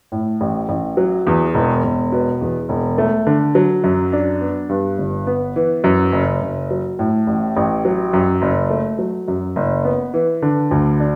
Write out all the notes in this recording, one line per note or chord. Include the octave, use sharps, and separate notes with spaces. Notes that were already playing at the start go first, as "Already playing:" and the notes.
A2
A1
A1
F#3
E2
E1
E1
B2
E2
E1
A3
D3
F#3
F#2
D4
B3
G2
G1
B3
E3
F#2
F#1
F#1
F#3
A2
A1
A1
F#3
F#2
F#1
A3
F#3
F#2
F#1
B3
E3
D3
D2
D4